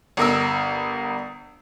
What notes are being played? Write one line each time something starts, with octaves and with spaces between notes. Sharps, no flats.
G1 A#4 E6